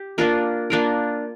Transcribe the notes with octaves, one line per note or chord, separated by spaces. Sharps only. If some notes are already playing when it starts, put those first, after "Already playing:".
Already playing: G4
A#3 D4 F4 A#4
A#3 D4 F4 A#4